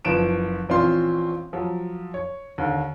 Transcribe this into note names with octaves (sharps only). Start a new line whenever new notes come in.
F#1 F3 B4 D7 E7
A#1 E3 C4 C#4 F4 C6
F3 F#3
C#5
D#2 D3